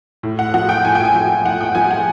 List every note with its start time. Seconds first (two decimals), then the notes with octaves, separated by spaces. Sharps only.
0.23 A2
0.39 F#5
0.54 F3 F#5
0.69 G5
0.84 A2 G#5
0.95 G5
1.05 G#5
1.15 F3
1.45 A2 F#5
1.61 G5
1.75 F3 G#5
1.91 F#5